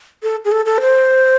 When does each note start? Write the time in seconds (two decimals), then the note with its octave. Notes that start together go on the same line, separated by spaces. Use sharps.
0.23 A4
0.45 G#4
0.52 A4
0.66 A4
0.81 C5